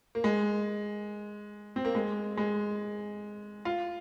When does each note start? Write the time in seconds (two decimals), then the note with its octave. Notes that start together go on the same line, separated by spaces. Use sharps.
0.15 A#3
0.24 G#3
1.76 C4
1.85 A#3
1.95 G#3
2.37 G#3
3.65 F4